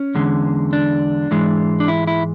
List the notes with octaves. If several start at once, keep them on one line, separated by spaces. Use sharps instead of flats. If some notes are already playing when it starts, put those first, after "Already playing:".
Already playing: C#4
E2 D3 G#3
D4
G#2 E3 G#3
D4
E4
E4